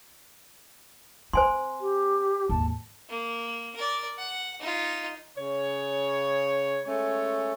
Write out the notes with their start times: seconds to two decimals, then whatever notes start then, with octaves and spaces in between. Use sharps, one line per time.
1.33 C4 C5 G#5 C6
1.80 G4
2.49 D#2 G#2 A5
3.09 A#3
3.76 A#4 D5
4.18 F#5
4.60 D#4 F4
5.38 C#3 C#5
6.86 G#3 A3 C#4 C#5